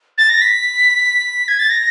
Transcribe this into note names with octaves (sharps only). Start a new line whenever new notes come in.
A6
A#6
B6
G#6
A6
A#6